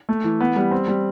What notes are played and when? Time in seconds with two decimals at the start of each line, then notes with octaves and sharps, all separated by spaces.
0.09 A3
0.24 E3
0.40 B3
0.56 G3
0.71 C4
0.88 G3